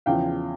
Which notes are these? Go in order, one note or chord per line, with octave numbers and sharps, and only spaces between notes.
E2 C#3 F3 F5 G5